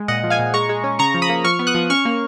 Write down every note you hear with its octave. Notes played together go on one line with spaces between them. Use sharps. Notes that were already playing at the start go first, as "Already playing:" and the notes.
Already playing: G#3
A#2 D#5 F#5
F3
F5 G#5
A#2
G#3 A#5 C#6
G#3
C#4
C#3 A#5 C#6
F3
B5 D#6
A#3
F3 C#6 F6
B3
D#6 F#6
F3
C#4 C#6 F6
A#3